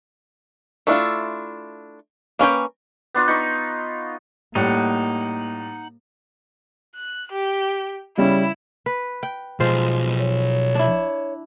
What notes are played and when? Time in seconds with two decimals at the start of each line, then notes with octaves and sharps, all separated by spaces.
0.87 A3 D4 E4 F4
2.39 A#3 C#4 B4 G5
3.14 B3 D4 F4
3.28 D#4 D#5 B5 C#6
4.55 A2 G3 A#3 D#4 F#5
6.95 F#6
7.32 G4
8.17 C#3 G3 C#4 E4
8.86 B4
9.23 G5
9.60 B1 F3 G#3 C5
10.19 C#5
10.75 D4 E4